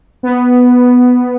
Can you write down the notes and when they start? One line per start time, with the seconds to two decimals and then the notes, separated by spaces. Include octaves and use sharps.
0.23 B3